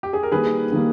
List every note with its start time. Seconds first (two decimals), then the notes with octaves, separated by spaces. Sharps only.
0.03 G4
0.13 G#4
0.23 A#4
0.32 D#3 G3 A#3 G#4 B4
0.72 D#3 G3 A#3